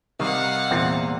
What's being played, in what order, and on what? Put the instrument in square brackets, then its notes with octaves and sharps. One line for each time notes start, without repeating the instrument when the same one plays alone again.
[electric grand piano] C3 G3 [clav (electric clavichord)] D#3 [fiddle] F5 F#5
[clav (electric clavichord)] E2 A#2 C4